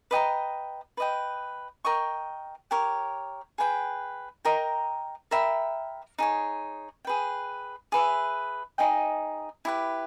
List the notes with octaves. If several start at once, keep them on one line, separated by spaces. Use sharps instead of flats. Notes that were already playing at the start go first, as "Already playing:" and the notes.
B4 D#5 G5 A#5
B4 D#5 G5
A#4 D#5 G5 C#6
G4 A#4 C#5
G#4 B4 G5
A#4 D#5 G5 A#5
A#4 E5 G5 B5
D#4 G#4 C#5
G#4 B4 G5
G#4 B4 E5
D#4 G#4 D#5 G5
E4 G4 B4